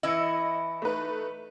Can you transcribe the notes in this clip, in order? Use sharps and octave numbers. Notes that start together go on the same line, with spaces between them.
E3 E4 D#5 C#7
A3 D#4 B4